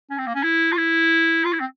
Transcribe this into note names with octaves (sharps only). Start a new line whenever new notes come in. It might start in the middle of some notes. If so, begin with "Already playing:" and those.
C#4
C4
A#3
C#4
E4
F4
E4
F4
E4
C4